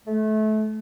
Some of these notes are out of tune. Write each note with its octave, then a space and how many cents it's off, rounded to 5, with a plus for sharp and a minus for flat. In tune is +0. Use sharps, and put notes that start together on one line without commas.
A3 -25